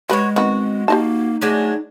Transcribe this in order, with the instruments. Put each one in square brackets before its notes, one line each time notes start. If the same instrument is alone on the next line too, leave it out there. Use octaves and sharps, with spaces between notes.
[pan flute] G#3 [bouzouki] F#4 C#5 [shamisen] G4 B4
[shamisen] D#3 B3 [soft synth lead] C4 [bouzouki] F#4
[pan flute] A#3 [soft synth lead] D#4 [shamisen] G4 D#5 A5
[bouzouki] F#3 G#3 D4 [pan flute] A3